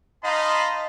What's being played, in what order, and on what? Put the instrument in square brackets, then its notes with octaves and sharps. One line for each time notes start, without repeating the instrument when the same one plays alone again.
[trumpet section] D#4 D#5 F5 A5 B5 C6